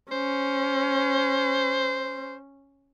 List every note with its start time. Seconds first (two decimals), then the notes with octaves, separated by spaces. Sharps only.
0.11 C#4 C5